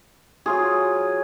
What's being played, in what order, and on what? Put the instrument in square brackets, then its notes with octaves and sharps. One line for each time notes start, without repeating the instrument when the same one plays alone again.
[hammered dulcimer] F#3 F4 G#4